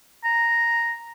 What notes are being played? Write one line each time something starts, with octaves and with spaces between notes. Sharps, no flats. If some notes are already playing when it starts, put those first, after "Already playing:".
A#5